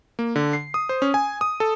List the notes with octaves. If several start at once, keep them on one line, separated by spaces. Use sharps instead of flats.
A#3
D3
C7
D#6
C5
C#4
G#5
D#6
A4